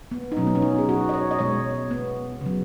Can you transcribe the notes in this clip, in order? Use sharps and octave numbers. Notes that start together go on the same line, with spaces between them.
B3
D#4
B2 F#3 C#4
B3
C#4
D#4
G#4
F#4
D#5
C#5
D#5
B2 G#3 C#5
B3
C#3 F#3